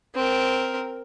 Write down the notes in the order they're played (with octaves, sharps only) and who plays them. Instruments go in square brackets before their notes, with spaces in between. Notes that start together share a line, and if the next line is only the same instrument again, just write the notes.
[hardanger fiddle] C4 A#4